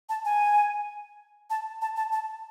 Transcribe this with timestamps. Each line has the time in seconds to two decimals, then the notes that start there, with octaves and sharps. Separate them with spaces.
0.09 A5
0.25 G#5
1.50 A5
1.82 A5
1.97 A5
2.12 A5